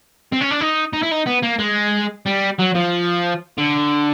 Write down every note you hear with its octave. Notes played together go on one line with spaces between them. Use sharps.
C4
C#4
D4
D#4
D#4
E4
D#4
B3
A#3
G#3
G3
F#3
F3
D3